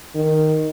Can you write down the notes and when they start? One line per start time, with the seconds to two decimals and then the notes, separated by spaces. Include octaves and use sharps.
0.15 D#3